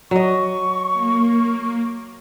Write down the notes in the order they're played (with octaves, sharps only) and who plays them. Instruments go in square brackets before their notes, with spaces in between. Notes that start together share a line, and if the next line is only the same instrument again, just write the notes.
[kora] F#3 D#5 [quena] C#6
[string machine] A#3